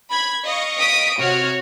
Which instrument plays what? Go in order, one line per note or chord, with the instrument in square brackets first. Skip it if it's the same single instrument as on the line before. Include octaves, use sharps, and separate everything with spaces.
[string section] B5 G#6
D#5 F5 C#6
[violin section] D#6 B6 D7
[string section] C3 F6 [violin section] F#4 C#5